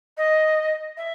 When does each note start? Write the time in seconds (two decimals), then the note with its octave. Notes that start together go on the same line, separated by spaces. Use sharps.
0.17 D#5
0.97 E5